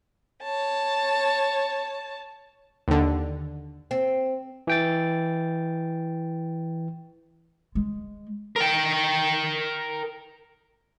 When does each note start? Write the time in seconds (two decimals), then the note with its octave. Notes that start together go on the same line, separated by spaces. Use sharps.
0.43 C#5 A5
2.88 D#2 D3
3.91 C4
4.67 E3 G5 A6
7.75 G#3
8.56 A#4 G5